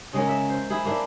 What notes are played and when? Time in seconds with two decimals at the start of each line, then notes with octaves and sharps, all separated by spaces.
0.13 C#3 G#3 C#4 A#4
0.28 E5
0.49 C5
0.70 E4 G#4
0.85 A#3 D4 E4